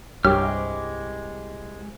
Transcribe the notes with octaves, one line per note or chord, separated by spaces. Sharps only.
C2 G2 G#3 G4 C#5 D6 F6